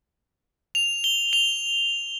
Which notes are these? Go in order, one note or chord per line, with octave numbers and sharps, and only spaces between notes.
F7
G7
F7